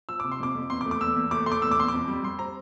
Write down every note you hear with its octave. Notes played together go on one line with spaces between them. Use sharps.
F3 E6
C3 D6
C6
F2 D6
F2
E2 C6
D6
A3
D6
E2 E6
E2
A3 D6
A3 C6
D6
E2 E6
D6
E2 C6
F2 D6
G3
G3 C6
C4 A#5